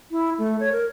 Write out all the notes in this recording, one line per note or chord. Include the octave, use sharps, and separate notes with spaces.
E4
A3
C#5
A#4